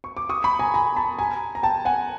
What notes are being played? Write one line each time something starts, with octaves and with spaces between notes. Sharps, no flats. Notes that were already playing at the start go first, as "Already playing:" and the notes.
C#6
D6
C#6 D#6
B5 C#6
G#5 A#5
G#5 A#5
A5 B5
G#5 A#5
A#5
G5 A5
F#5 G#5